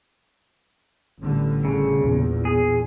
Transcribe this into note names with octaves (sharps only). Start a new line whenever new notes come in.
A1 D3 G3
C#3
A#1 E2
G#4